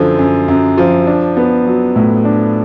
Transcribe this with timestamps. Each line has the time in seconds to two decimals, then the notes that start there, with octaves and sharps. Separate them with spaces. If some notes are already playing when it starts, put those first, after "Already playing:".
Already playing: F#2 D3 F3
0.19 F#2
0.48 F#2
0.78 F3
1.07 D4
1.37 B3
1.66 F#3
1.96 A2
2.25 D4